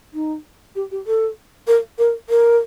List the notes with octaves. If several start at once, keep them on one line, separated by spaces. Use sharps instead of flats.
D#4
G4
G4
A4
A#4
A#4
A#4